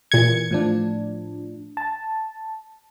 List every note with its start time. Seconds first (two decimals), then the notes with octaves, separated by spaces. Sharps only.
0.12 A#2 E3 G#6 C#7
0.51 A2 F3 D4
1.77 A5